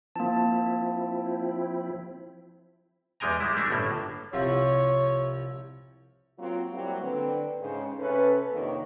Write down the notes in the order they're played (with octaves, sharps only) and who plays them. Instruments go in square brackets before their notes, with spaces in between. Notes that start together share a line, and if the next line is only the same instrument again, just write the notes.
[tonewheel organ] F3 C4 E4 [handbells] A#3 A5
[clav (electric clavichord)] E2 G3 G#3 G5 G#5 A#5
G3 G#3 E4
G3 A3 D4 F#4 E5
G1 A2 A#3
[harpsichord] C2 F3 E4 [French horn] C#5
[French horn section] F#3 A#3 C4 F4
F#3 G3 A#3 C4 E4 F#4
D3 C4 B4
G#2 C#3 C5
C3 C#4 A4 B4
F2 C3 D#3 A#3 D4 C#5